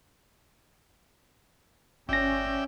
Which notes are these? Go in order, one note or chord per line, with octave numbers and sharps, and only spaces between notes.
G1 C#4 D5 E5 G5 A#6